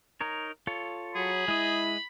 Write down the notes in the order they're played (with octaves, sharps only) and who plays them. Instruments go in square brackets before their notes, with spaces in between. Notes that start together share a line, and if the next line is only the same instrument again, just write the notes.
[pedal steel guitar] D#4 A#4 C#5
F4 A4 C#5
[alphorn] F#3 [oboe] G#4 [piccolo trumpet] B5
[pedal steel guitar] G#3 D#5 [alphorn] E4